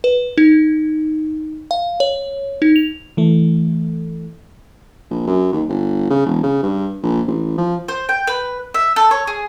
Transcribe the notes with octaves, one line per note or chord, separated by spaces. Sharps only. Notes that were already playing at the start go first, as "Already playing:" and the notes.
B4
D#4
F5
C#5
D#4
F7
E3 A3
A#1
F#2
D#2
G1
C#3
E1
C#3
G2
A#1
A1
F3
C5
G5
B4
E5
A4
C#5
G#4